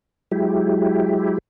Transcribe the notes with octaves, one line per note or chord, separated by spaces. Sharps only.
F#3 G#3 E4 G4